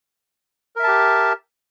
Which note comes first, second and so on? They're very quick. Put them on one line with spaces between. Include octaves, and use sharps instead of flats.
A#4 E5 A5 G4